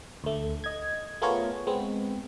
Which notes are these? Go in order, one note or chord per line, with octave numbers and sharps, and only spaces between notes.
D2 A3
D#5 G#6
A3 B3 F4 G#4 A#4 C#5
G#3 B3 C4